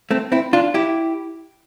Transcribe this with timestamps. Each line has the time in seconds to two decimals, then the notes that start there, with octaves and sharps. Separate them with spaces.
0.11 A3 C4
0.32 C4 E4
0.53 D4 F4
0.74 E4 G4